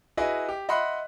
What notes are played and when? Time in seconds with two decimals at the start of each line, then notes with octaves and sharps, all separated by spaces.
0.17 E4 F#4 G#4 B4 D#5
0.49 G4
0.69 D#5 E5 F#5 B5 C6 F#6